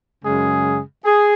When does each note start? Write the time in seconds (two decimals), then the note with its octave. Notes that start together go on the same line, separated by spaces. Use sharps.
0.24 F#2 C#3 G#3 G#4
1.05 G#4